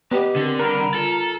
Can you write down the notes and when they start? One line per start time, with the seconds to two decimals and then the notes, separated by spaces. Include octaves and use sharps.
0.11 B3 G4 D#5 G5
0.36 D3 C4 A#4
0.59 G3 A#4 A#5 B5
0.94 F4 A4